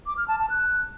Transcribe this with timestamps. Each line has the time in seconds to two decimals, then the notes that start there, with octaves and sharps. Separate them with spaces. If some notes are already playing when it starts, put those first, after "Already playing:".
0.06 D6
0.17 F6
0.28 A5
0.39 A5
0.50 F#6